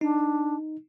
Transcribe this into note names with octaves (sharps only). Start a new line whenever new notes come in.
D4 D#4